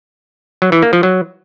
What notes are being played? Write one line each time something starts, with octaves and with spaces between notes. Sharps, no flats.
F#3
E3
A#3
F3
F#3